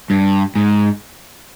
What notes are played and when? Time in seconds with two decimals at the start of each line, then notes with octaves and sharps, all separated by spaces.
0.10 G2
0.55 G#2